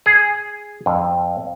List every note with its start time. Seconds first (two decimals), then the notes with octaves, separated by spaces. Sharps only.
0.06 G#4
0.86 F2